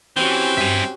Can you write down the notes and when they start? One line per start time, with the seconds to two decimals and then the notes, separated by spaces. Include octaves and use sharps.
0.16 E3 C4 C#4 F#4 G4
0.57 G2 E5 G#5